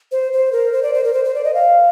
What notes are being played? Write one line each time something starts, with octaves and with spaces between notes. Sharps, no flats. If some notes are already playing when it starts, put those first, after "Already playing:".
C5
C5
A#4
C5
D5
C5
A#4
C5
C5
D5
D#5
F5